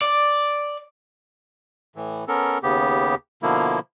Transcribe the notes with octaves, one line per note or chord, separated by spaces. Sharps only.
D5
A2 E3
B3 C#4 A4 A#4
D#2 C#3 B3 G4
B2 D3 F3 A#3 E4